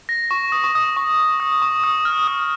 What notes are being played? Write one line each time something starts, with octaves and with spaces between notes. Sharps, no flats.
A#6
C#6
D#6
C#6
D#6
C#6
D#6
C#6
D#6
F6
D#6